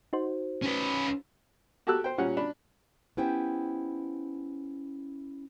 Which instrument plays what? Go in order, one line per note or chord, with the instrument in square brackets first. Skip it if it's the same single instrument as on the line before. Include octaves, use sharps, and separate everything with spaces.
[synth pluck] D#4 F#4 C5
[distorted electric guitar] C#4 B4
[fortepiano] F#4 G4 A4 A5 E6 F#6
C5 G5
A#2 G3 C#4 F#5
D4 B5
[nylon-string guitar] B3 C#4 E4 G4 C5 G5